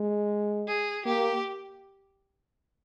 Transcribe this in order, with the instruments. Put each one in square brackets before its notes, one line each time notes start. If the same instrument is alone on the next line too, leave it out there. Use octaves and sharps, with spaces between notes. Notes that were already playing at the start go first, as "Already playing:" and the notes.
Already playing: [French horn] G#3
[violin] G#4
[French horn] A#3 [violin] G4